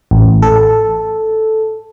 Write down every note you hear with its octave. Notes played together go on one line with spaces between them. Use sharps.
A1
A4